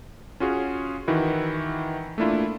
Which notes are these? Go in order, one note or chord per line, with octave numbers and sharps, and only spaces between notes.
C#4 F4 F#4 G#4
D#3 E3 E4 F#4
A3 A#3 D4 E4 F4